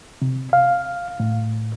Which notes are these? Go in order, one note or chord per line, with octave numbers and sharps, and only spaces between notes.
C3
F5
A2